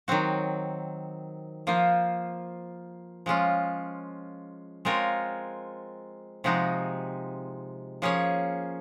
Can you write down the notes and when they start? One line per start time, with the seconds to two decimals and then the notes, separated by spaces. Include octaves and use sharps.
0.08 D#3 F#3 C4 F#4
1.67 F3 A#3 F4 C5
3.26 F3 G#3 C#4 F4
4.85 G#3 C4 F4 A#4 C#5
6.44 C3 F3 G#3 D#4 F#4
8.02 F3 A#3 C#4 G#4 C#5